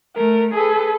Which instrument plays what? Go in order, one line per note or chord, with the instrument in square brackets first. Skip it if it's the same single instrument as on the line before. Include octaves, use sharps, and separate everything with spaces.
[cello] A3 [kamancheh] A#4
[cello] G#4 B4 [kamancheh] A4